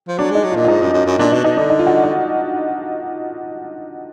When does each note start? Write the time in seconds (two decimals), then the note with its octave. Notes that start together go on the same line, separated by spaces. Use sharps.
0.08 F3
0.18 F#3 D4
0.31 G#3 D#4
0.44 F#3
0.52 F4
0.56 A#2
0.64 F4
0.68 G#2 D#4
0.81 F#2
0.94 F#2
1.06 F#2
1.19 A#2 D4
1.32 B2 D#4
1.44 B2 D#4
1.57 D3 D4
1.70 D#4
1.79 F4
1.87 F#4
2.04 D#4